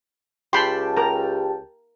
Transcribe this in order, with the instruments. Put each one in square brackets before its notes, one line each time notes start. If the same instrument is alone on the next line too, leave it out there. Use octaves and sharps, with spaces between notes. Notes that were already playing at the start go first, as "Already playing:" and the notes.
[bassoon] C#2 [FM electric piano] G4 G5 A5 [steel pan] B5 C6
[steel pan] A#4 A#5